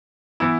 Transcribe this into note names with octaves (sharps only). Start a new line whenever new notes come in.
E3 B3 E4